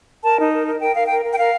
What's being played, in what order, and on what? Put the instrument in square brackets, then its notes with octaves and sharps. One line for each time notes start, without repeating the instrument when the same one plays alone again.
[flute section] A#4 A5
D#4
A#4
A#4
A#4 G5
A#4 F5
A#4 G5
A#4
G5
A#4 F5